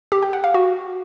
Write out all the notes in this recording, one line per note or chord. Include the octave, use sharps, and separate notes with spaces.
G4
G5
F#5
F5
F#4